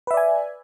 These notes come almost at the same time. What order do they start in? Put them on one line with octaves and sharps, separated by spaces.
B4 E5 D5 G#5